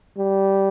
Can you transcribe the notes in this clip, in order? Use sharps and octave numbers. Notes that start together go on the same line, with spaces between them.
G3